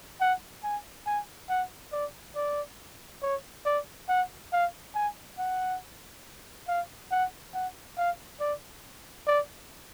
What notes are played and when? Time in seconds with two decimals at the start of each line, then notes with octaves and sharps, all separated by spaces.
0.21 F#5
0.63 G#5
1.06 G#5
1.49 F#5
1.92 D5
2.36 D5
3.22 C#5
3.65 D5
4.09 F#5
4.53 F5
4.95 G#5
5.39 F#5
6.68 F5
7.11 F#5
7.54 F#5
7.97 F5
8.40 D5
9.27 D5